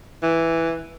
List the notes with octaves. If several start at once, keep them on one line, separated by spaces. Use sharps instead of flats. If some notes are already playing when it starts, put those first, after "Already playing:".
E3